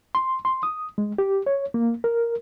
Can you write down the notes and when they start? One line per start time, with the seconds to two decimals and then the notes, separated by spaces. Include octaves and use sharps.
0.15 C6
0.45 C6
0.63 D#6
0.98 G#3
1.18 G4
1.46 C#5
1.74 A#3
2.04 A#4